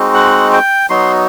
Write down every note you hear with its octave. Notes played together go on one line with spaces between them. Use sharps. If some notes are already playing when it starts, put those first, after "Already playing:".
Already playing: G#3 C4 D#4 F#4
F#5
G5
F#3 B3 D#4 F#4 C6